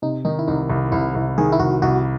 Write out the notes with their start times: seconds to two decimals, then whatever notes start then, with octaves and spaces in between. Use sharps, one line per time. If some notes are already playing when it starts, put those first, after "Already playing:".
0.02 C3 D#4
0.25 D#3 D#4
0.39 E4
0.48 C2 D#4
0.70 C2
0.92 C2 E4
1.15 C2
1.38 D#3 G#4
1.52 E4
1.59 C2 F#4
1.82 C2 F#4